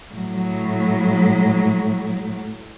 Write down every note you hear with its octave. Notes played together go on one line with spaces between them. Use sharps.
A2 F#3